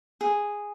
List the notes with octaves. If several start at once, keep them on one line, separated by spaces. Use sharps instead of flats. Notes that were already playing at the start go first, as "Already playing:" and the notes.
G#4